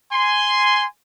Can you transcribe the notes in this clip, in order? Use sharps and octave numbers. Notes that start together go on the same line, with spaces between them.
G#5 C6